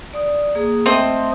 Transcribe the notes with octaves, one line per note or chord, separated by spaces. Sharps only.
D5 D#6
A#3 G#4 D#6
A3 C4 D#5 E5